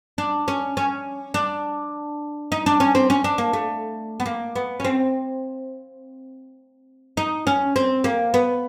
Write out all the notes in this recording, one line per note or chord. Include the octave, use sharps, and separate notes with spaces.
D4
C#4
C#4
D4
D#4
D4
C#4
C4
C#4
D4
A#3
A3
B3
A#3
B3
C#4
C4
D#4
C#4
C4
A#3
B3